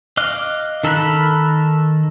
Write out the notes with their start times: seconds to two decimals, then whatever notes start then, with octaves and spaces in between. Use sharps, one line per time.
0.17 D#5 F5 D6 F6 F#6
0.84 D#3 A4 A#4 B5 F#6